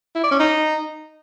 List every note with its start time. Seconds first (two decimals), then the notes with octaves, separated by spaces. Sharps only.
0.15 E4
0.23 D5
0.31 C#4
0.39 D#4